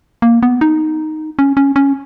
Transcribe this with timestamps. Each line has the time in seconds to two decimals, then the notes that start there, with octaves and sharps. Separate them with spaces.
0.22 A#3
0.43 B3
0.61 D#4
1.39 C#4
1.57 C#4
1.76 C#4